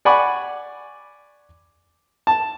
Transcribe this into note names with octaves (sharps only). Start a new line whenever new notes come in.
D5 F#5 G#5 B5 C#6 D6
A5